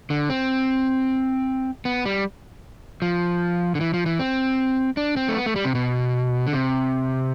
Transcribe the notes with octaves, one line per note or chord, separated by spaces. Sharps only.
D3
C4
B3
G3
F3
D3
E3
F3
E3
C4
D4
C4
A3
B3
A3
G3
C3
B2
D3
C3